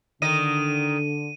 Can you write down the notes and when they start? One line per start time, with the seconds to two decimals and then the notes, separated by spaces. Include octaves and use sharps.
0.22 D3 D#3 D#5 D#7